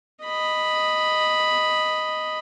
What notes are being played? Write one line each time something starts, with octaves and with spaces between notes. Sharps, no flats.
D#5 B5